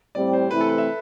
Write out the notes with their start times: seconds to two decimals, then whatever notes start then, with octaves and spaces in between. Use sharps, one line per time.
0.15 A2 G3 C4 D5
0.33 C5
0.51 C3 E3 A3 C4 E4 B4
0.61 A4
0.69 B4
0.78 E5